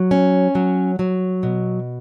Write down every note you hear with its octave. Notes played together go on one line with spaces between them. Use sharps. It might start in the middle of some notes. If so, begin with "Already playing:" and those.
Already playing: F#3
C#4
F#3
F#3
B2